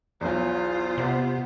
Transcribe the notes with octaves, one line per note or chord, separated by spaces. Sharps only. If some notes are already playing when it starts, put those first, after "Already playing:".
B1 E2 F4 C5
C3 B3